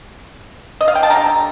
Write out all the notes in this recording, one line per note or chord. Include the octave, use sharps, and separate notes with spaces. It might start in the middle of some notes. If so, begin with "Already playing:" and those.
D#5
F5
G5
A5
D3 G3 A#5